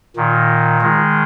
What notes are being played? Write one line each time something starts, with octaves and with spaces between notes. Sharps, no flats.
A#2 D#3
D#3 G#3